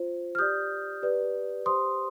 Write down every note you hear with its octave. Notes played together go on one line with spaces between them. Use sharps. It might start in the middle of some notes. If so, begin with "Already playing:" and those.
Already playing: F4 C5
F6
G4 D5 D#6 G6
G4 B4 D5
G4 C5 C6 D#6